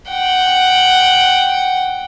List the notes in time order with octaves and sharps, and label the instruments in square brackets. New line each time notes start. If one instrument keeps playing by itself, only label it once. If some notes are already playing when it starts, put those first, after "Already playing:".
[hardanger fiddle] F#5 G5